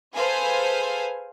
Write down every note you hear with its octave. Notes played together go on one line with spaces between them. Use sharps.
G#4 A4 B4 C5 F5 G#5